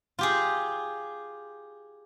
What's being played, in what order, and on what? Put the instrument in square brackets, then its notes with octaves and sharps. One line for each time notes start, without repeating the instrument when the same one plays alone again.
[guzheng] F4 G4 G#4